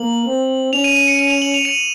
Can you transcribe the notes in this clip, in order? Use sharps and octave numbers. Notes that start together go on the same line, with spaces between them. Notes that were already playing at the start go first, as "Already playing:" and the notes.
Already playing: A#3 F#7
C4
C#4 F7
D#7
D#7
C#7
D#7
F7
F#7
F7
D#7